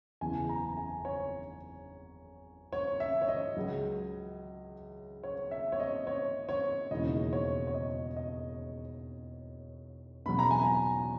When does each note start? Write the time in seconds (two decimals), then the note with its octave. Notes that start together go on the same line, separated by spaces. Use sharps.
0.21 F#1 E2 C#3 E3 G#5
0.49 A#5
0.77 G#5
1.05 C#5
2.72 C#5
3.00 E5
3.22 C#5
3.28 D#5
3.56 C#2 C#3 F#3
5.23 C#5
5.51 E5
5.72 C#5
5.80 D#5
6.07 C#5
6.49 C#5
6.91 E1 D#2 C#3 E3 D#5
7.33 C#5
7.67 C#5
7.74 D#5
8.16 D#5
10.26 E2 B2 F#3 B5
10.39 A#5
10.51 G#5
10.63 A#5